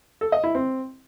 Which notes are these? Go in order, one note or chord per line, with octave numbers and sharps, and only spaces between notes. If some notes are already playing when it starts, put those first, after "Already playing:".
A4
D#5
E4
C4